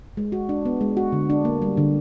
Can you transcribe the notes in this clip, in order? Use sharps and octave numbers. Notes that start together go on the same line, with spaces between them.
G#3
F#4
D4
B3
G#3
F#4
D3
D4
A#3
G3
D3